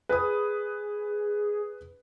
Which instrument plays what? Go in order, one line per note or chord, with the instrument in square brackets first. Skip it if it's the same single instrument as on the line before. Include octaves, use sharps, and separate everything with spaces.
[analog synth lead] G#4 [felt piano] B4 D#6